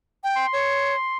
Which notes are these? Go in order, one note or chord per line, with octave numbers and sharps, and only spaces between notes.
G5
C6
C#5